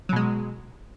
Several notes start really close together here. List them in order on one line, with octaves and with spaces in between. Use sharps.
F#3 B2 G#3